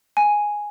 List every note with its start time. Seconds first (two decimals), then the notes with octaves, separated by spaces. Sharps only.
0.17 G#5